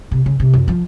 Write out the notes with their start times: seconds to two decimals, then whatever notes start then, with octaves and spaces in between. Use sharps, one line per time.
0.11 C3
0.26 C#3
0.40 C3
0.53 F#2
0.68 F3